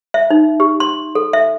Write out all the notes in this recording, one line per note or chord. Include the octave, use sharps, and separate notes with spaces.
E5
D#4
G4
C6
A4
E5